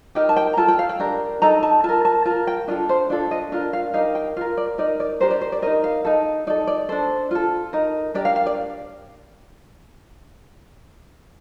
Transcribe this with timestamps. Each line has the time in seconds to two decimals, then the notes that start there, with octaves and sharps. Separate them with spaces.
0.15 D#4 G4 A#4 G5
0.29 A5
0.36 G5
0.53 A#5
0.57 F4 A4 A5
0.68 G5
0.79 F5
0.89 G5
1.00 D4 G4 A#4
1.42 D#4 A4 A#5
1.63 A5
1.84 F4 A5
1.89 A#4
2.05 A5
2.25 F4 A5
2.30 A#4
2.47 G5
2.68 D4 F4 A4 D#5
2.89 C5
3.10 D4 F4 A4 D5
3.31 D#5
3.52 D4 F4 A#4 F5
3.73 F5
3.94 D#4 G4 A#4 F5
4.15 G5
4.36 F4 F5
4.41 A#4
4.57 D5
4.78 D#4 A#4 D5
5.00 D5
5.20 D4 G4 A#4 C5
5.31 D5
5.41 C5
5.52 D5
5.62 A#4 D#5
5.67 D#4
5.84 F5
6.05 D#4 A4
6.47 D#4 A4 D5
6.67 D5
6.89 D4 A4 C5
7.31 F4 A4
7.73 D#4 A#4
8.15 D4 G4 A#4 D5
8.25 F5
8.36 F5
8.46 D5